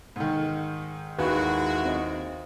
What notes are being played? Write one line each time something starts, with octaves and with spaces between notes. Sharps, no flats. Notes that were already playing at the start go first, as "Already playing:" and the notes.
G#2 D#3
D#2 G#3 E4 F#4 B4
C4 D#5